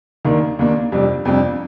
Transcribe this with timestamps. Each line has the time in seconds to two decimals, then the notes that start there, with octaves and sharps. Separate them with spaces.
0.25 D#2 D#3 A#3 D4
0.59 D#2 D#3 A#3 D4
0.92 F2 C3 G3 D4
1.25 F2 C3 G3 D4